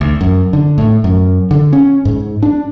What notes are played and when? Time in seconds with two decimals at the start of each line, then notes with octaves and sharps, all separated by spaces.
0.01 D2
0.21 F#2
0.53 D3
0.78 A2
1.04 F#2
1.51 D3
1.73 C#4
2.05 G#2
2.43 D4